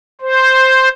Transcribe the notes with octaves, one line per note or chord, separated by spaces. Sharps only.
C5